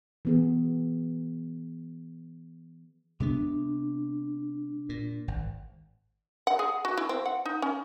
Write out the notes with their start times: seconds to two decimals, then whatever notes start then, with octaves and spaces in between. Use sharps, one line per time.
0.25 E3 B3 G#4
3.20 C3 G#3 B3 D4
4.89 A#2
5.28 G#1
6.47 F#5
6.59 G#4
6.85 F#4
6.97 E4
7.09 C4
7.26 F#5
7.45 D#4
7.62 C#4